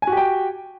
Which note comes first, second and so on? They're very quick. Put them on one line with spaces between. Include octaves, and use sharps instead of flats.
G#5 F#4 G4 G5